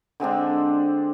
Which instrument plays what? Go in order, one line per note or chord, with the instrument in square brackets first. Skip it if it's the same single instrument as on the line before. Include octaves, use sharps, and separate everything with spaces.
[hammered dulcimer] D3 G#3 C4 D4